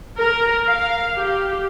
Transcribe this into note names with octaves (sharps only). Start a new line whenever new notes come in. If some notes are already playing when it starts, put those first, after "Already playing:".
A#4
F5
G4